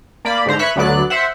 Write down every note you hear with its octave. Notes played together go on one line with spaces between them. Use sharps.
A#3 D5 B5
G#2 D3 C5 A#5
B4 C#5 E5 B5 C#6 F#6
D2 D3 F#3 B3 D5 F#6
C5 E5 F#5